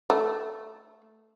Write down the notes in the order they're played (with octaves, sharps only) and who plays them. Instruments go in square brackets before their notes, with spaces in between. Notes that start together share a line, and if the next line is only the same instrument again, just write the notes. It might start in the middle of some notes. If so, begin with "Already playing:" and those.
[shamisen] A3